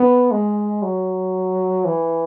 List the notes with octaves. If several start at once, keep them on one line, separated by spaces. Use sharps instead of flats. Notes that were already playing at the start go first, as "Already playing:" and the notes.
Already playing: B3
G#3
F#3
E3